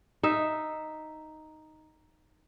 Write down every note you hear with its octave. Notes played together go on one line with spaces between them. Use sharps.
D#4 E5